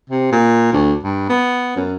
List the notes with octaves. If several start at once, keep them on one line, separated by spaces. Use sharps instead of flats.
C3
A#2
D2
G2
B3
F#2